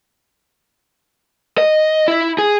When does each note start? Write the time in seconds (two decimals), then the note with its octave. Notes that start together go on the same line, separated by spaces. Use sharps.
1.58 D#5
2.08 E4
2.38 G#4